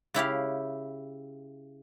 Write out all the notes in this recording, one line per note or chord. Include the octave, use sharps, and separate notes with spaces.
C#3 E4 G4 F5